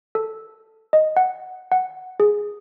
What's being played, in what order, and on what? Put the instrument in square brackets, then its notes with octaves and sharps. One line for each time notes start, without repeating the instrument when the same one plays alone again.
[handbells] A4
D#5
F#5
F#5
G#4